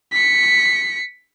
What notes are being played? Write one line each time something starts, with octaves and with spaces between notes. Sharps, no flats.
B6 C#7